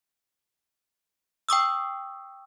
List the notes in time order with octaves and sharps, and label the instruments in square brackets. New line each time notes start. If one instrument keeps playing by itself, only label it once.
[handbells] G5 C#6 D#6 E6